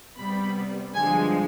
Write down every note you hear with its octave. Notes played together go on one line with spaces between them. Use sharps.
C3 G3 B3 B5
G2 D3 F3 G#3 G#5